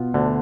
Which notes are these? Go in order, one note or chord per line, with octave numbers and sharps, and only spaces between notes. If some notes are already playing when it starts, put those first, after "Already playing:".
Already playing: B2 B3 F4
D2 D3